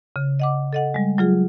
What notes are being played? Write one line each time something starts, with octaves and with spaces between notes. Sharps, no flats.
C#3
D#5 F#5 D6
A4 D#5 F#5
G3 G#3
F#3 F4 G#4